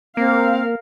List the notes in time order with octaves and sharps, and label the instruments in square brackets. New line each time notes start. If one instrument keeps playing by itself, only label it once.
[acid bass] A#3 [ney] C4 [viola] A#4 F5